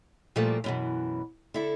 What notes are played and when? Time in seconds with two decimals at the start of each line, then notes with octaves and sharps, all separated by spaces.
0.36 A#2 F3 G3 A3 A#3
0.64 F#2 B2 E3
1.54 D3 E4 A4